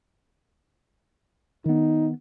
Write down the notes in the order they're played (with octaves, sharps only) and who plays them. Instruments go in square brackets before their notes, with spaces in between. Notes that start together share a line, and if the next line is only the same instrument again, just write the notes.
[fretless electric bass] D#3 B3 [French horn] D#4